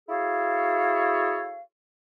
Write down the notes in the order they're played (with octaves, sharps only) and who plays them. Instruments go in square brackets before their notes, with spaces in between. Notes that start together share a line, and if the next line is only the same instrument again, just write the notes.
[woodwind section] E4 F#4 G#4 A4 C#5 F5